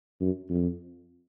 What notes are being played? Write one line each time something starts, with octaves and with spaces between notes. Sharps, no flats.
F#2
F2